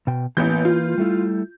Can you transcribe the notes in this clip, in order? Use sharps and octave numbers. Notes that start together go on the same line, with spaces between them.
B2 G5
A1 E3 A#3 B3 B4 G6
F4
G3 A3 E4